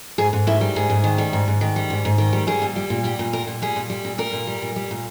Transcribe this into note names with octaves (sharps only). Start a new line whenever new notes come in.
G#2 G#4
G#2
D#3 E4
G3
G#2 G#4
G#2
D#3
G3
G#2
G#2
D#3
G3
G#2
G#2
D#3
G3
G3 G#4
A#2
G3
A#2
G3 G4
A#2
G3 A#4
A#2
G3 G#4
A#2
G3
A#2
G3 A#4
A#2
G3
A#2
G3
A#2